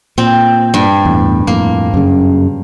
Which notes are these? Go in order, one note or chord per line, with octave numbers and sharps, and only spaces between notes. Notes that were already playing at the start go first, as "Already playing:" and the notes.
A#2 C4
G2
E2 A2
F2 A2 A#3
F#2 C#3